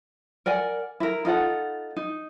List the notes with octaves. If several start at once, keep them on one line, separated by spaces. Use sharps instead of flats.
A#4 D5 F#5 G#5
E4 A#4
D#4 F4 A4 F#5
D#4